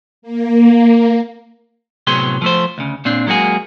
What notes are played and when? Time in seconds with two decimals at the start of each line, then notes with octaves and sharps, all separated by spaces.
0.22 A#3
2.07 A2 C3 F#3 B3 G#4 C6
2.42 F3 A3 C5
2.78 D2 C#3
3.05 A#2 C4 D4
3.27 F#3 G#3 A#3 F#4 G#4